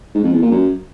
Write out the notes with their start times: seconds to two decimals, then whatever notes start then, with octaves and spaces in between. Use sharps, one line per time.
0.15 G#2
0.24 F2
0.33 E2
0.42 A#2
0.51 F#2